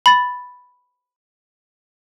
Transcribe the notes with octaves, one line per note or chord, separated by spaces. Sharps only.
B5 A6